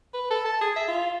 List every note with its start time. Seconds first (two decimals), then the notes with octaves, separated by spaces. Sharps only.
0.14 B4
0.31 A4
0.46 A5
0.61 G#4
0.76 E5
0.88 F4